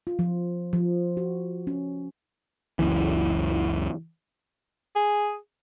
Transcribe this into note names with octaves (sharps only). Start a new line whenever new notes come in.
F4
F3
F3
F#4
C#4
F#1 C#2 E3
G#4